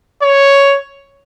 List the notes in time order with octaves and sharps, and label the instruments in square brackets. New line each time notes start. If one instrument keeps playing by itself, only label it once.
[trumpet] C#5